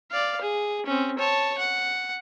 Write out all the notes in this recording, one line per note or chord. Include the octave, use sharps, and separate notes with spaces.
D5 F5
G#4
C4 C#4
C#5 A5
F#5